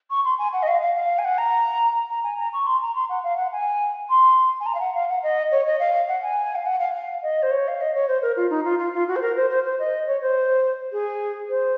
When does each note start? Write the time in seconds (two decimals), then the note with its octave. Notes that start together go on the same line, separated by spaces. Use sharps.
0.10 C#6
0.25 C6
0.39 G#5
0.53 F#5
0.63 D#5
0.68 F5
0.82 F5
0.96 F5
1.19 G#5
1.25 F#5
1.38 A#5
2.10 A#5
2.24 G#5
2.38 A#5
2.53 C#6
2.67 C6
2.82 A#5
2.95 C6
3.09 F#5
3.24 F5
3.38 F#5
3.53 G#5
4.10 C6
4.60 G#5
4.66 A#5
4.75 F5
4.80 F#5
4.94 F5
5.09 F#5
5.23 D#5
5.51 C#5
5.66 D#5
5.80 F5
6.08 F#5
6.22 G#5
6.55 F5
6.66 F#5
6.80 F5
6.94 F5
7.23 D#5
7.43 C5
7.51 C#5
7.68 F5
7.81 D#5
7.95 C#5
8.08 C5
8.22 A#4
8.37 F4
8.50 D#4
8.65 F4
8.79 F4
8.94 F4
9.08 F#4
9.16 C5
9.22 A#4
9.36 C5
9.50 C5
9.65 C5
9.79 D#5
10.07 C#5
10.21 C5
10.92 G#4
11.49 C5